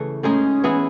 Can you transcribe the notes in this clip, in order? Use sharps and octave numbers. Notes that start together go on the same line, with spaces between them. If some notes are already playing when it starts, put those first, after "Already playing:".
Already playing: C#3 E3 A3
A2 G#3 C#4 D#4 G#4
E3 B3 E4 G#4